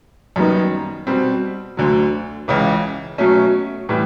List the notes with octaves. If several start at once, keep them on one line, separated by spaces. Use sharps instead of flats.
F#2 D#3 G3 B3 D#4
B2 G3 C4
D2 D3 F#3
C#2 C#3 E3
B2 F#3 A3 C#4
A2 E3 G3